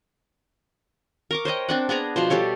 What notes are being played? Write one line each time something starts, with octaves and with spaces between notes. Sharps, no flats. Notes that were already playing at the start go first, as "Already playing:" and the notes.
A#4 C#6 D6
C5 C#5 D#5 G5
C4 D4 F#5
B3 D4 G#4 A#5
B2 F3 C5
G3 G4 A4 C#5